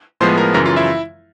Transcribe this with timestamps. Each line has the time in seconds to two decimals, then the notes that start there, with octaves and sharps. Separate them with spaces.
0.20 A2 F3 G#3 B3 C5 C6
0.38 A#4 A#5
0.54 F#2 C#3 E3 A#4 A#5
0.65 F4 F5
0.76 E4 E5